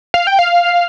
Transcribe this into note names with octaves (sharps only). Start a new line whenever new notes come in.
F5
G5
F5